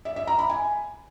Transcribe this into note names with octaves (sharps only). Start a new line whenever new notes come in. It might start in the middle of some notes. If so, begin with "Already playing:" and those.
E5
E5
A#5
B5
G#5